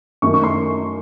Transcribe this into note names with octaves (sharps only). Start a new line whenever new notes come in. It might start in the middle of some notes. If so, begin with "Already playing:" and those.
F#2 D#3 A3 C#6
C#6
C6